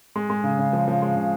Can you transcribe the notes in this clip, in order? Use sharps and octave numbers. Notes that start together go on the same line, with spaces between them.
G#3
G#3
C#3
C#3
F3
F3
G#3
C#3